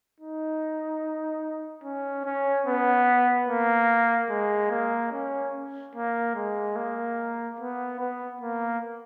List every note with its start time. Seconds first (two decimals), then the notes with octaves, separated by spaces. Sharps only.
0.20 D#4
1.84 C#4
2.25 C#4
2.67 B3
3.49 A#3
4.30 G#3
4.71 A#3
5.12 C#4
5.95 A#3
6.36 G#3
6.76 A#3
7.60 B3
7.99 B3
8.41 A#3